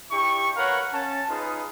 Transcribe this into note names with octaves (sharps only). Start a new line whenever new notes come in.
D4 E4 G4 C#6
A#4 B4 C#5 F5 F#5
C#4 A5
D#4 F4 G#4 B4